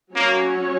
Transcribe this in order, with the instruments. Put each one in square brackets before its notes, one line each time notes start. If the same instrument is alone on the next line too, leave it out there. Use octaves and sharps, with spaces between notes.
[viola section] F#3 C#4 F#4 C#5 [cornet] A#3